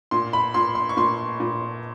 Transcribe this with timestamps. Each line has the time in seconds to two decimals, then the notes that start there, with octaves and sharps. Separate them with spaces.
0.11 A#2 C6
0.33 B5
0.54 A#2 C6
0.75 C6
0.89 C#6
0.97 A#2 C6
1.40 A#2